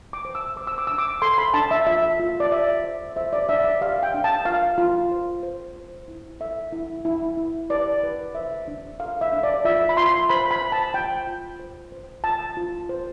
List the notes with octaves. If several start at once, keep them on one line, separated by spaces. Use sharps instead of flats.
D6
C5
E6
C5 D6
E6
D6
D4 E6
D6
A4 C6
B5
D4 A5
E5
F4 E5
F4
D5
C5 E5
C5
C5 E5
D5
D4 E5
D5
G4 F5
G5
D4
A5
F4 F5
F4
C5
C5
C5
E4
A4 E5
E4
E4
E4
B4 D5
B4
C5 E5
D4
A4 F5
E5
D4
D5
F4 E5
B5
F4 C6
C5 B5
B5
C5
A5
F4 G5
F4
C5
C5
F4 A5
F4
C5